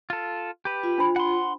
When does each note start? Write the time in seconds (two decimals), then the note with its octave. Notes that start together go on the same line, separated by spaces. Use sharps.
0.10 F4 A4
0.65 G4 B4
0.83 F4
0.98 D4 C5 B5
1.16 F#5 C6